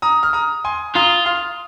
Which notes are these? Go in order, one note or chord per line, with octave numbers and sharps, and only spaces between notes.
A#5 D#6
F6
A#5 D#6
G#5 C6
F4 A#5 D#6
C6 F6